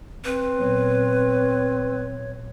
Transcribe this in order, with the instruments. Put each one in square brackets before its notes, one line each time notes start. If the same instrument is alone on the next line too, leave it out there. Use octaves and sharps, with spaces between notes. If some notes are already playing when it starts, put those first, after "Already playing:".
[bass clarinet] C4 [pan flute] B4
[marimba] A#2 F#3 B3 [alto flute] C#5